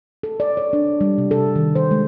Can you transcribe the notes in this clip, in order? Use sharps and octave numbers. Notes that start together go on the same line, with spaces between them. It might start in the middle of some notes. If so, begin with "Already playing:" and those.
A4
D5
C#5
D4
G3
C3
A4
D#3
C5
G#3